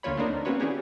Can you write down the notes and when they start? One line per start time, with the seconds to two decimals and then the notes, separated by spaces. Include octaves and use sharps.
0.03 D2 D3 A#3 F4 C#5 B5
0.17 A3 A#3 C4 D4 D#4 A#4
0.45 A#3 C4 C#4 F#4 B4 C#5
0.60 D3 E3 C#4 G4 G#4